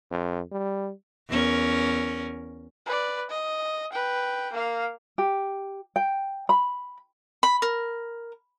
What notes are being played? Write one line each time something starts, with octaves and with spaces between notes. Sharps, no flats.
F2
G3
E2 C#4 A#4
B4 D5
D#5
B4 G5
A#3 F5
G4
G5
B5
B5
A#4